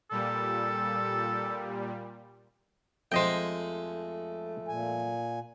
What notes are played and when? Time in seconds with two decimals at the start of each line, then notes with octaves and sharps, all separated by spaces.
0.11 A#2 G3 A4
3.12 F2 G#3 A3 C5 D#5 G5
4.68 A#2 G#5